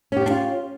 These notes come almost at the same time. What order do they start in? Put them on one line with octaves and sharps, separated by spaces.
C#4 G4 B3 D4 F4